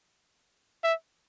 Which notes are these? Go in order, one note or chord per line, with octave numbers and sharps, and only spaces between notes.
E5